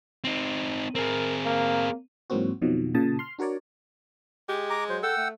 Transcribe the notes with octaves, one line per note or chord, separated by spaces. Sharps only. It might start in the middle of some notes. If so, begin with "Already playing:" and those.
C4 D#4
C4 G#4 A#4
A#3
G#2 E3 F#3 A#3 C4 F#4
F2 B2 D#3 F3 F#3
A#2 C#3 A5 D#6
C6 F6
D4 F#4 A#4 C#5 D5
G#3 G4
A#5 D6
F#3 C5
A4 F#5 G5 E6
A3